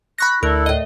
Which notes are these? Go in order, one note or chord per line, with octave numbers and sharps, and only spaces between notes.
B5 C#6 F#6 A#6
D2 E4 A4 A#4 D5 F#6
A2 D#5